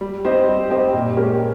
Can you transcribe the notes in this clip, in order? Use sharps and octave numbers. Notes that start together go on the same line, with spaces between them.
G3
C4 G4 C5 D#5
G3
C4 G4 C5 D#5
A#2
G#3 C#4 G4 A#4